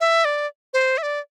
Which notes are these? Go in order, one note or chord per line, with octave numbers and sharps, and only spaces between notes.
E5
D5
C5
E5
D5